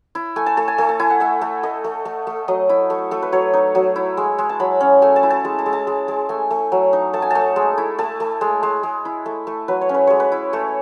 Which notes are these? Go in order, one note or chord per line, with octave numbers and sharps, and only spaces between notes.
E4
A3 G#5
A5
A3 A5
G#5
A3 A5
A5
E4 G#5
F#5
A3 E5
A3
A3 D#5
A3
A3
A3
F#3 D#5
E4
A3
A3 A4
B4
F#3 C#5
D#4
F#3
E4
G#3
G#3
A5
F#3 B5
C#4
A3 G#5
A5
E4
A5
G#3 A5
A5
G#3
A5
G#3
G#3
A3 G#5
A3
F#3
D#4
A3 A5
G#5
A3 A5
G#3
E4
A3 A5
A3
G#3
G#3
G#3
E4
A3
A3
F#3 B4
C#5
C#4
B4
G#3 C#5
B4
E4
A3 C#5